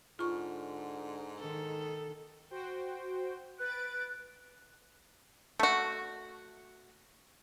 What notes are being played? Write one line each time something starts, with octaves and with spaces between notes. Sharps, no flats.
G#2 D3 F4 C#6
D#3 A4
F#4 C5 G5
B4 F#6 A6 D7
A3 F#4